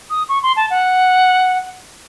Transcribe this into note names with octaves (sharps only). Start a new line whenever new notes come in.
D#6
C#6
C6
A5
F#5